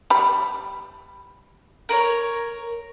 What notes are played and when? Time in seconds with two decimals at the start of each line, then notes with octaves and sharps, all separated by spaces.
0.10 G3 B5
1.89 A#4 B4 C#5